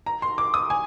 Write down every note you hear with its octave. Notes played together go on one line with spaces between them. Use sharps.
A#5
C6
D6
D#6
G#5